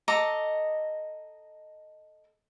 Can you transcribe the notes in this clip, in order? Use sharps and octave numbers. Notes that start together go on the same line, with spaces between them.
A4 D#5 A#5 D6